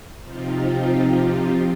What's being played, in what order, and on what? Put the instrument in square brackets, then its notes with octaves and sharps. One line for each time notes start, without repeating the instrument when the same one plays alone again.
[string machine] C3 F3 C4 D#4 F4 G4